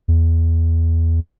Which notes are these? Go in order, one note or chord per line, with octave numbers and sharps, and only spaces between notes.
E2